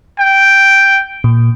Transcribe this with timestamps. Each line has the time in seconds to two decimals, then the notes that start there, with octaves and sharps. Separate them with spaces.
0.19 G5
1.24 A#2